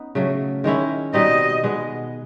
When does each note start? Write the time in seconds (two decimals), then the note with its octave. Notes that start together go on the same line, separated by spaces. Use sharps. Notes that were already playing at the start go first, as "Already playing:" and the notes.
Already playing: B3 C#4 D#4
0.15 C#3 F#3 A3
0.64 D#3 G#3 C#4 E4
1.14 B2 G3 C4 D#4 D#5
1.63 B2 G#3 B3